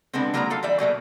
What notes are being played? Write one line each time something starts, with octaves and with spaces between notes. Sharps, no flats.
D3 G#3 B3 C4
F#3 G#3 A#3 D4 A#4 A#5
F4 A4 F5
E3 G3 D5 E5
B2 F#3 A3 A#3